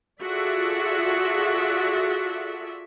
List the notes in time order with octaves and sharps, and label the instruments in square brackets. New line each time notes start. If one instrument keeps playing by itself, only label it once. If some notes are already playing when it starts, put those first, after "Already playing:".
[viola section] F4 F#4 G#4 A4 D5 E5